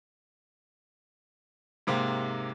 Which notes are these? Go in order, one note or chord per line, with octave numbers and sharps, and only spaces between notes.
G#2 C3 A#3 G4